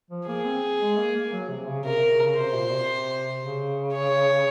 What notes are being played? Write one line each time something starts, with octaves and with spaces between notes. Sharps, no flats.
F3
A#3 G#4
C4
G#3
A#3
A#3
F#3
C3
C#3
C3 A#4
C3
C#3
C#3
C3 C5
A#2
C3
C#3
C#5